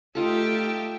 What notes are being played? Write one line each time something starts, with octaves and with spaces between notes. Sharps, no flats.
A3 D#4 F4 G4 A4 E5